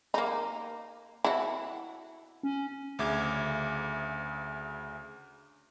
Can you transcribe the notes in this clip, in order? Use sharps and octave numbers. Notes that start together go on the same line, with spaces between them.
A#3 D#4
E4 F#4
C#4
D2 C#3 E5 D6 G#6